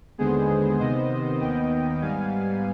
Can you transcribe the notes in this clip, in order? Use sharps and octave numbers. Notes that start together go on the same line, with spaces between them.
D#2 D3 G#3 B3 G#4 C5
C3 D#3 B3 C5 D#5
D#2 D#3 B3 D#5 G5
G#2 G3 B3 F5 G#5